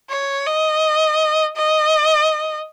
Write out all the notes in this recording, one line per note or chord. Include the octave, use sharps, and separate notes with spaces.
C#5
D#5
D#5